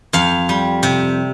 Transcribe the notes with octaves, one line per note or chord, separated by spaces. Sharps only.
F2 F5
G3
C3